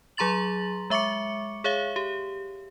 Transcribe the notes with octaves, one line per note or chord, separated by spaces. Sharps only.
F#3 G#4 A#5 C6 A6 F#7
G#3 E5 C#6 D6 C#7
G#4 C#5 E5 F5
G4